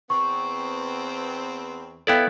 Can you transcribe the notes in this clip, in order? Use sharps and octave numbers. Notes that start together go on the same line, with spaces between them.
E2 B3 C4 C#6
B3 E4 A4 D5 F5 G5